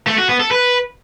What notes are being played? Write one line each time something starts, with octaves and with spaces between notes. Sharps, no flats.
A3
F#4
B3
A4
B4